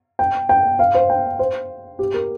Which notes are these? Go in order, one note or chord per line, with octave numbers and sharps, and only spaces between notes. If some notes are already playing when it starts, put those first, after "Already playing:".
G5
G5
F5
C5
G5
C5
G4
A#4